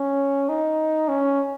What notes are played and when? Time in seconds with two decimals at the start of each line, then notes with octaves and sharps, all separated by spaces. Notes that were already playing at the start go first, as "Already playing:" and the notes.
Already playing: C#4
0.49 D#4
1.09 C#4